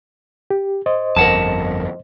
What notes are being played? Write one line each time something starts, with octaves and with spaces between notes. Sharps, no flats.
G4
C5 D#5
G1 F2 A#4 F#5 A5